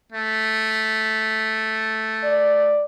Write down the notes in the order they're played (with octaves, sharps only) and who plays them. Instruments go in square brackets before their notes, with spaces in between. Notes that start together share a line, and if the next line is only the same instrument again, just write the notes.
[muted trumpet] A3
[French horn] D5